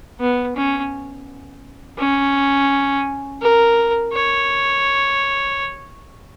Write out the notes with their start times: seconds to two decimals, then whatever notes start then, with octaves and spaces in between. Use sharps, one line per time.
0.20 B3
0.56 C#4
1.99 C#4
3.42 A#4
4.13 C#5